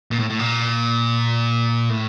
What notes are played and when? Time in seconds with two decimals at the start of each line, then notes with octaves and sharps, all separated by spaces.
0.11 A#2
0.20 A2
0.30 A2
0.40 A#2
1.89 A2